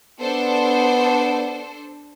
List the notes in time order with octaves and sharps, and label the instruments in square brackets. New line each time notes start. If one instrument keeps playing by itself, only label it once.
[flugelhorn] B3 [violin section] D4 A4 C5